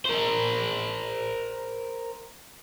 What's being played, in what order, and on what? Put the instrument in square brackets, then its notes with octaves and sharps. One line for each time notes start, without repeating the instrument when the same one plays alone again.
[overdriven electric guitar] A#4 C5